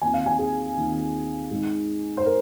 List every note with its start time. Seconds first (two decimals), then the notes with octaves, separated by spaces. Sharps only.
0.01 D#2 D#3 C4 F4 G#5
0.13 F5
0.26 G#5
0.38 G#4
0.76 D#2 D#3 C4 F4
1.51 G#2 G#3 D#4
2.17 C5
2.26 A#4